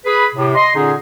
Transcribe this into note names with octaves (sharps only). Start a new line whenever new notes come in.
G#4 B4 B5
A2 C3
D#5 C6
A#2 D3 C#4 D#4 G#4